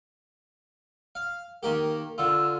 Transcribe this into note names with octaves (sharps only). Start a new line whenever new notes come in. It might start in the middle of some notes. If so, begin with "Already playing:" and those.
F5
D#3 A#3 G4 A#4
D3 F4 E6